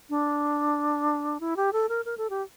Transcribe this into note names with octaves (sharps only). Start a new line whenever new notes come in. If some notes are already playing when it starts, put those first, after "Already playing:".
D4
E4
G4
A4
A#4
A#4
A4
G4